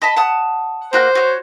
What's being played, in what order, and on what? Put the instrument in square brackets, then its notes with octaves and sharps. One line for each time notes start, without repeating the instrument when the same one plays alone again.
[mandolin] D#5 A5 B5
F#5 A5 D#6
[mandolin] A#3 F#4 F#6 [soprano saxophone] C5
[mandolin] F#4 C#5